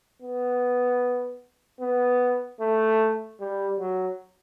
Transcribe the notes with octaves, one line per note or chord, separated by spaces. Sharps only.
B3
B3
A3
G3
F#3